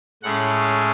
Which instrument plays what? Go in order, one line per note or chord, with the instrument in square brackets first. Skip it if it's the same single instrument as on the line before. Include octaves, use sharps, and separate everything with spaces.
[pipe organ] A2 G#3 C#4 F#5